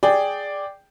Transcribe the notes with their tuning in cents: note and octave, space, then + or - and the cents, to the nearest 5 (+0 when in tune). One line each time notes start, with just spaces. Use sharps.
G#4 +0 D5 +0 G5 +0